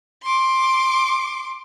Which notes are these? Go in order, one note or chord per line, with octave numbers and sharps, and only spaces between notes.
C6 D6